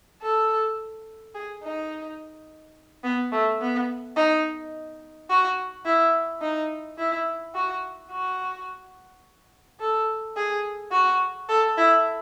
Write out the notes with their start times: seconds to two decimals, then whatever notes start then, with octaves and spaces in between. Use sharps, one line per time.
0.23 A4
1.35 G#4
1.63 D#4
3.04 B3
3.32 A3
3.61 B3
4.16 D#4
5.30 F#4
5.86 E4
6.42 D#4
6.98 E4
7.55 F#4
8.12 F#4
9.80 A4
10.37 G#4
10.92 F#4
11.49 A4
11.78 E4